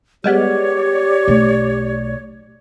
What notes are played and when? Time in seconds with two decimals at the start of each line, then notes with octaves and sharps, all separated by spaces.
0.24 G3 G#3 B3 G4 C#5 D5
1.27 B1 A3